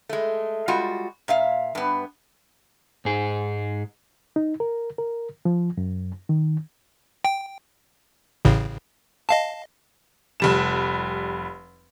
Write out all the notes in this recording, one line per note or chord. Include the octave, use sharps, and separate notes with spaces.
G#3 A3
G3 G#3 F4 F#4
A#2 E5 F5
G2 B3
G#2 G#4
D#4
A#4
A#4
F3
F#2
D#3
G5
A1 A2 C#3
D#5 F5 A5
F1 G3 E7